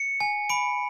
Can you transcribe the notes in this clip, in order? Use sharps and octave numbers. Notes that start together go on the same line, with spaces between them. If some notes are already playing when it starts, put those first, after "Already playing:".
Already playing: C#7
G#5
B5 D7